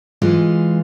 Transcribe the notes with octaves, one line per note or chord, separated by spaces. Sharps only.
E3 G#3 F4